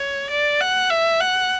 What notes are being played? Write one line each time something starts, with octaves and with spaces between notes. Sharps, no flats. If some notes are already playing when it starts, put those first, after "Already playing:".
Already playing: C#5
D5
F#5
E5
F#5